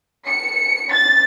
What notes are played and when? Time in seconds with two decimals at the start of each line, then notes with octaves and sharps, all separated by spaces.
0.27 C#7
0.91 A6